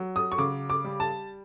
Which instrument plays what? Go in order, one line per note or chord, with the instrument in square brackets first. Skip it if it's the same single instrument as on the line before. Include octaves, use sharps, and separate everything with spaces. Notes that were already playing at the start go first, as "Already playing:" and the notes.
Already playing: [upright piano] F#3
D#6
C#6
C#3 D6
D6
G3
A5